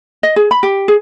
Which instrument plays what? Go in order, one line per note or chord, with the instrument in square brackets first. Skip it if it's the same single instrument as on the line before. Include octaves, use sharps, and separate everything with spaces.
[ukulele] D#5
G#4
B5
G4
G#4